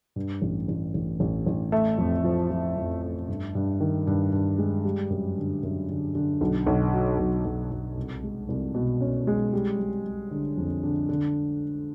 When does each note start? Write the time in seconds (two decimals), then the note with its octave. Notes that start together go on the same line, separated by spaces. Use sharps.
0.16 G2
0.42 A1
0.68 A1
0.94 A1
1.20 A1
1.46 A1
1.72 A3
1.98 F2
2.24 F3
2.51 F3
2.77 F2
3.02 A3
3.28 G2
3.55 G2
3.80 D#3
4.07 G2
4.33 G2
4.58 G#3
4.84 G3
5.10 F#2
5.37 D3
5.63 F#2
5.89 D3
6.15 D3
6.41 B1
6.67 B1
6.93 F#3
7.19 B1
7.45 B1
7.71 B1
7.97 C2
8.23 G#3
8.49 C2
8.75 B2
9.01 C#4
9.27 G#3
9.53 G3
9.79 G3
10.05 G3
10.31 D3
10.57 F2
10.83 D3
11.09 D3